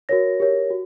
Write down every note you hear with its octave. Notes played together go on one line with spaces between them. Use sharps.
F#4 A#4 C#5 A#6
G4 A#4 C#5
F#4